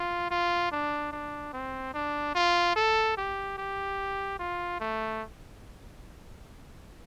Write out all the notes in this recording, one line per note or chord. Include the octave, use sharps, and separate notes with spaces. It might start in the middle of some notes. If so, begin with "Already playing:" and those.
Already playing: F4
F4
D4
D4
C4
D4
F4
A4
G4
G4
F4
A3